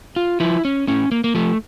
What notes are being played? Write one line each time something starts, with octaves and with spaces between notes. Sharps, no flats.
F4
F3 E4
C#4
A2 C#4
A#3
A#3
F3 A3